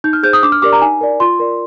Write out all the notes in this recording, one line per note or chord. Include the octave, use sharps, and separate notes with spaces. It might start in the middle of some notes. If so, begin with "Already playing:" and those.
D#4 G6
F6
G#4 C5 G6
D#6
D4 D6
F6
G4 A#4 D5 D6
A#5
D#4 G#5
A#4 D5
F4 C6
A#4 D5